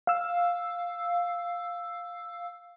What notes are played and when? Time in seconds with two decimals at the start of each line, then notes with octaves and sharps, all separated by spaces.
0.07 F5 E6